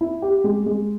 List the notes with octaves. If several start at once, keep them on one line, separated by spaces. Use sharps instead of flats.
E4
G4
G#3
G#3